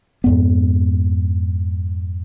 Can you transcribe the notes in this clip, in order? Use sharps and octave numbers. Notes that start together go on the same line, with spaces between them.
F2 G#2 B3